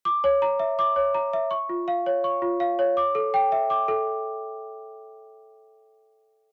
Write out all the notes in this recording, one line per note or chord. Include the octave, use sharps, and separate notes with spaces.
D6
C#5
A#5
E5
D6
C#5
A#5
E5
C#6
F4
F5
C#5
C#6
F4
F5
C#5
D6
A4
G5
E5
D6
A4